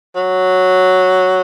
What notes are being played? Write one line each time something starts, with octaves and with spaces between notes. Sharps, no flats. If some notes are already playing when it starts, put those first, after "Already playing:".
F#3